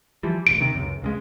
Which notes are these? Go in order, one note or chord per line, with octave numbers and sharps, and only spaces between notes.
E3 F3 G3
E1 A1 D7
C3 D#3
C#2 F#2
C#2 C#3 G#3